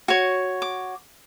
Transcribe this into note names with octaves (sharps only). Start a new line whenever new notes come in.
F#4 C#5
D6